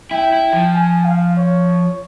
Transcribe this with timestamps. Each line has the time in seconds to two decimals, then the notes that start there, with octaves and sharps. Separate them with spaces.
0.11 E4 G5
0.32 E4
0.53 F3
0.74 G#5
1.05 F5
1.37 C#5